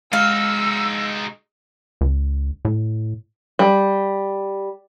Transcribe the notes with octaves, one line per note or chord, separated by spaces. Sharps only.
G#3 D#4 F#4 F5 E6
C#2
A2
G3